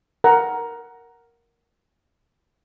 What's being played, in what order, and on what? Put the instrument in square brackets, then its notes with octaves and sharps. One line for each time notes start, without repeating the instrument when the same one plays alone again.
[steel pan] A#4 F#5 A#5